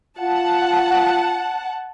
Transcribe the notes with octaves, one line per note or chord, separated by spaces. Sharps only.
F4 F#5 A5